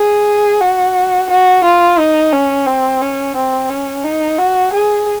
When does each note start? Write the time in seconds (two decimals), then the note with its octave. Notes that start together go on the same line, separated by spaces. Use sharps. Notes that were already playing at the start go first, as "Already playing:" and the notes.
Already playing: G#4
0.61 F#4
1.30 F#4
1.64 F4
1.99 D#4
2.33 C#4
2.66 C4
3.01 C#4
3.36 C4
3.70 C#4
4.04 D#4
4.38 F#4
4.73 G#4